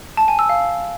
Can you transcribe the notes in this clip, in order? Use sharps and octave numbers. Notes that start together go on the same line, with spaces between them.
A5
G#5
E6
F5